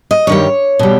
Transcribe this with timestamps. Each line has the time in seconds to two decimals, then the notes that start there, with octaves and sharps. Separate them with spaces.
0.11 D#5
0.27 G2 D#3 G3 C#5
0.79 B2 G3